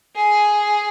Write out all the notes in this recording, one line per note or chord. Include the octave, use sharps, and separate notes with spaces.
G#4